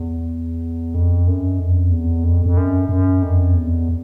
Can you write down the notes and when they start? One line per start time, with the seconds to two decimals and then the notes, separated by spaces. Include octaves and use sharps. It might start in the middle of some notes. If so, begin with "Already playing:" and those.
Already playing: E2
0.94 F2
1.27 F#2
1.60 F2
1.92 E2
2.24 F2
2.46 F2
2.57 F#2
2.89 F#2
3.22 F2
3.55 E2